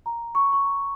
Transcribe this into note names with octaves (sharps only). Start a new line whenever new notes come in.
A#5
C#6
C#6
A#5